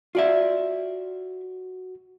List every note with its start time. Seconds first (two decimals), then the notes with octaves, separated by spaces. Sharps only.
0.15 F4 F#4 D5 E5